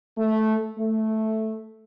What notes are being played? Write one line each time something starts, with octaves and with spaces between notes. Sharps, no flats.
A3
A3